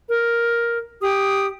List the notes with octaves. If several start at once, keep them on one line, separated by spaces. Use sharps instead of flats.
A#4
G4 D#6